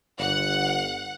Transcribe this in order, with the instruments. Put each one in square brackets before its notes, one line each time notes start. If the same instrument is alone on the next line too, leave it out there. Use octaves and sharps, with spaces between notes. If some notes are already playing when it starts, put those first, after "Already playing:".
[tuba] G1 [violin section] F#5